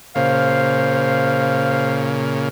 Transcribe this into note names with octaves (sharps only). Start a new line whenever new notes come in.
A#2 C#3 C5 F5